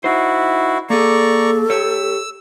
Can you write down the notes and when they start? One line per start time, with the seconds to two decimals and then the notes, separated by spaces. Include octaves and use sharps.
0.04 D#4 E4 F#4 C5
0.90 A#3 G#4 A4 D5 A#5 C#6
1.70 G4 C#5 E6